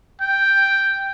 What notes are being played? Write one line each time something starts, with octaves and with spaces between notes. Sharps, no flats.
G5